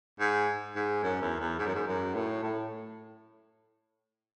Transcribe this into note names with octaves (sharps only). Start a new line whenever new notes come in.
G#2
G#2
F#2
E2
E2
G#2
F#2
G#2
F#2
A2
A2